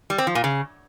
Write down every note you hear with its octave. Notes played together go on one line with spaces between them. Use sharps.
G3
C4
F3
A#2
C#3